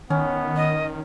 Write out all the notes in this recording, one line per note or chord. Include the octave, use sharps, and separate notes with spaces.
D#3 B3 C#4
D#5